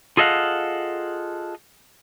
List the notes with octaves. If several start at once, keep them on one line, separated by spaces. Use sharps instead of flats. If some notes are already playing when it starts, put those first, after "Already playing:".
F4 G#4 A4 D#5 F5 F#5